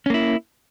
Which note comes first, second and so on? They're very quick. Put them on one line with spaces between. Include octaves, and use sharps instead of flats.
C#4 A#3 E4